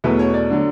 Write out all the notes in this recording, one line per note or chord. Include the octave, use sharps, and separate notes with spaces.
E2 B2 F#3 A3 B4
C#5
D5
D3 F#3